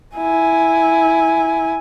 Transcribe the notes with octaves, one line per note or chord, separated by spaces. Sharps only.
E4 G#5